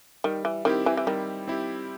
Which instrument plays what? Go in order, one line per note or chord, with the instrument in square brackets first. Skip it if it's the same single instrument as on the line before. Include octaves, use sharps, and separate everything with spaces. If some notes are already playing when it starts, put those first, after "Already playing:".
[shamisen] D#3 [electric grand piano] G3
[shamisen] E3
[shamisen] D#3 [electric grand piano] C4 E4 G4
[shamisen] E3
E3
[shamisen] D#3 [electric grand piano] G3
[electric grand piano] C4 E4 G4